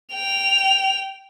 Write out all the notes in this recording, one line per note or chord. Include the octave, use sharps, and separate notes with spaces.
G5 F7